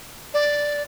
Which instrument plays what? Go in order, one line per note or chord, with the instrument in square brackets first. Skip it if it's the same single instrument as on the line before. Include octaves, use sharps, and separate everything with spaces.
[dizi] D5